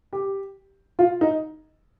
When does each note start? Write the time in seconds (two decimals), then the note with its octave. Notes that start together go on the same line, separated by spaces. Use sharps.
0.13 G4
0.99 F4
1.21 D#4